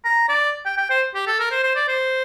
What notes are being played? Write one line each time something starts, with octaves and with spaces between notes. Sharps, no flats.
A#5
D5
G5
G5
C5
G4
A4
A#4
C5
C5
D5
C5